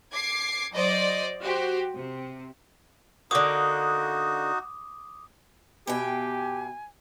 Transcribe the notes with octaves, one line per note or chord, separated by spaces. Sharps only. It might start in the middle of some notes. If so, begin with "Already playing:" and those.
D6 G#6 C7
F#3 C5 D5 D#5
F#4 G4 C5
C3
D3 A#3 D#4 F#4 D6 D#6
B2 G4 E5 G5 G#5